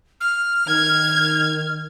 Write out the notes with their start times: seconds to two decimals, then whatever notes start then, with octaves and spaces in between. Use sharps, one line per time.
0.21 F6
0.68 D#3 G#6